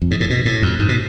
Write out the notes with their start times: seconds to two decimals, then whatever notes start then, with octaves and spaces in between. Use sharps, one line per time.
0.02 F2
0.11 G#2
0.20 A2
0.30 B2
0.45 A2
0.62 F2
0.79 G#2
0.89 B2